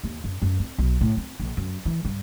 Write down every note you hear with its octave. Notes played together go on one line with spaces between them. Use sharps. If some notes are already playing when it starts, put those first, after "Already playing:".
D#2
F#2
F#2
C4
B1
A2
C4
A#1
F#2
E3
G2